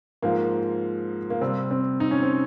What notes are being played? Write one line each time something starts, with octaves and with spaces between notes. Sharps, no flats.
G#2 F3 G#3 A#3
A#3
C3 G3 C4
C4
D#4
C#4
C4